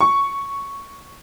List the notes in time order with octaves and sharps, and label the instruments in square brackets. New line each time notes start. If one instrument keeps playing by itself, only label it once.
[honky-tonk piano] C#6